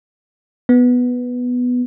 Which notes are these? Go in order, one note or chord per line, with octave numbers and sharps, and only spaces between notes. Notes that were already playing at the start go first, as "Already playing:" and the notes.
B3